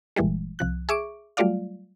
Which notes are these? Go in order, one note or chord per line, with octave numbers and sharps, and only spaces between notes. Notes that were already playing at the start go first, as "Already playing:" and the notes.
G1 A#2 E3 G3 G#3
C2 F3 F#6
G#4 E5 C#6 D6 D7
F#3 G3 A3 F4 D5 F5